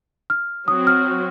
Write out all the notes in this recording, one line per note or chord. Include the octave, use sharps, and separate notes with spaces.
F6
F#3 C4 F#4 D#6
F6